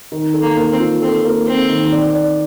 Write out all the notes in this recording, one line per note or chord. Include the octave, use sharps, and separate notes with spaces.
D#3
A4
A#3
A#3
C4
F4
C4 A4
A#3
C4 A4
D#3
D5
D5